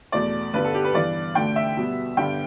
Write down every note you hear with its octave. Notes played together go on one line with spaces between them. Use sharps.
E2 B2 A3 D5
G2 D3 G3 B3 B4
A4
G4
B4
G2 E3 B3 D5
D2 D3 A3 G5
E5
B2 G3 B3
G2 D3 G3 B3 G5